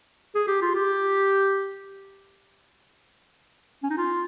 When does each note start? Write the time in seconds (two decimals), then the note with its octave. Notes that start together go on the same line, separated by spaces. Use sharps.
0.35 G#4
0.47 G4
0.62 F4
0.75 G4
3.83 C#4
3.90 D#4
3.97 F4